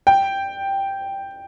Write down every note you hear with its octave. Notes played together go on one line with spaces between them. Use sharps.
G5